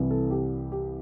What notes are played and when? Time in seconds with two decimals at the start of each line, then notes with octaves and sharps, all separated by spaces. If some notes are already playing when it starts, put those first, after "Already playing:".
Already playing: C2 C3 E3
0.11 A4
0.31 G4
0.72 G4